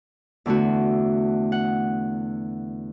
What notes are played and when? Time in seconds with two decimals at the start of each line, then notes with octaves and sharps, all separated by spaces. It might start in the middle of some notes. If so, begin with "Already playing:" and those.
0.46 E2 D3 A3 F#4
1.52 F#5